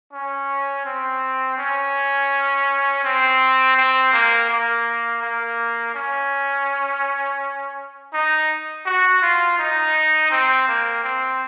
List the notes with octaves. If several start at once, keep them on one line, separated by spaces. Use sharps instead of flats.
C#4
C4
C#4
C4
C4
A#3
A#3
A#3
C#4
D#4
F#4
F4
D#4
C4
A#3
C4